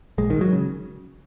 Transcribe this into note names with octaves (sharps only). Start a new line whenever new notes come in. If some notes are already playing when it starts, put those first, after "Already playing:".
A#1 G#3
G#2 D#3
F#3
C#3